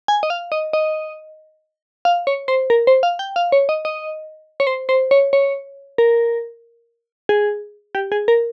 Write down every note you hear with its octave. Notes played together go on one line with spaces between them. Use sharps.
G#5
D#5
F5
D#5
D#5
F5
C#5
C5
A#4
C5
F5
G5
F5
C#5
D#5
D#5
C#5
C5
C5
C#5
C#5
A#4
G#4
G4
G#4
A#4